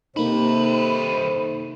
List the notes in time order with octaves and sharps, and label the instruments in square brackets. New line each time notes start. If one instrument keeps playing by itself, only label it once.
[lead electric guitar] C2 B4 [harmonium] C3 [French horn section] D#3 A4 C5 [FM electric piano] A#3 D#4